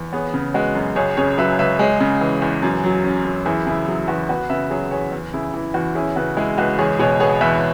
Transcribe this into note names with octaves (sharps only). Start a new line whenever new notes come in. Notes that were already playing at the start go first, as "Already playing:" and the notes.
Already playing: E2
B3 G#4 C#5
C#3
G#3 F#4 B4
F#2
C#2 G#4 C#5
C#3 G#4 C#5
F#3 B4 E5
C#2 B4 E5
G#3 G#4 C#5
C#3
E3
E2
F#2
F#3
C#4
F#2
E2 E4 G#4
C#3 E4 G#4
F#3 E4 G#4
E2 F#4 B4
B3 F#4 B4
C#3 B4 E5
F#3 G#4 C#5
E2 G#4 C#5
E2
C#3 E4 G#4
E3 E4
E2 F#4
C#4 E4 G#4
C#3 F#4 B4
G#3 E4 G#4
C#2 F#4 B4
E2 G#4 C#5
B2 G#4 C#5
B3 G#4 C#5
E2 B4 E5